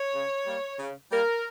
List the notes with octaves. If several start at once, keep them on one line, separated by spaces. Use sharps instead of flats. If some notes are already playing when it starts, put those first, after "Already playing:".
Already playing: C#5
C#3
G3 A#3
C#3
G3 A#3 A#4